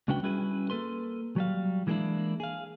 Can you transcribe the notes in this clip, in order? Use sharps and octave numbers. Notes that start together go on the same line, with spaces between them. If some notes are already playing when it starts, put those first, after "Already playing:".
C#2 C#4 D4 F#4 B4 G5
G3 C#4 E4 F#4 G#4 B4
A#3 A4 B4 C6
F#3 G3 F5
E3 G#3 A#3 B3 D4 E4
G#4 F5